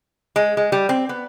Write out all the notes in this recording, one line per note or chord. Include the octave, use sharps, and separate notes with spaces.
G#3
G#3
G3
C4
B3